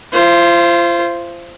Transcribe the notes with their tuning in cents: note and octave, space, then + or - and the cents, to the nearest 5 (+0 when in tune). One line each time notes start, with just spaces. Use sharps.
F4 -35 C5 +0